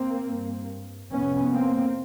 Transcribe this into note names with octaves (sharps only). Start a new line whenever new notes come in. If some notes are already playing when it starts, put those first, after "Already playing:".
Already playing: A#3 C4
G2
F2 C3 B3 C#4
A#3 C4